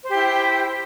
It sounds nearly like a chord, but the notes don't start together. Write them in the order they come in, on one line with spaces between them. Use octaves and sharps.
C5 G4 E4 G5